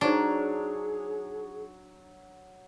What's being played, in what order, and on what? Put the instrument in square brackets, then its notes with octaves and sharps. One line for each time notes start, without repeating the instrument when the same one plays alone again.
[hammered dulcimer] F#3 C#5 [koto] D4 [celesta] D#4 C5 G7 [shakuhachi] G#4